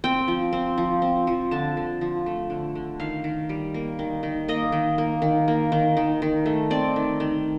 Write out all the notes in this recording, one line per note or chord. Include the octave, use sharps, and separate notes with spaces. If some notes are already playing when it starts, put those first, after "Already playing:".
C4 G5
F3
C4
F3
C4
F3
D3 A5
D3
F3
A3
D3
D3
D#3 F5
D#3
G3
A#3
D#3
D#3
A#3 D#5
D#3
A#3
D#3
A#3
D#3
D#3
D#3
A3
C4 D5
D#3
D#3